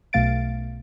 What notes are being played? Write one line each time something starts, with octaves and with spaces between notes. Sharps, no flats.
B1 B2 A3 F5 A6 D7